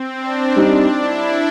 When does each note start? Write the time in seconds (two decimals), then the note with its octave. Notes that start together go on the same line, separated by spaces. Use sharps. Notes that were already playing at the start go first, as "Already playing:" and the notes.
Already playing: C4
0.17 D4
0.56 G3 C4 D4 D#4 G4
0.96 E4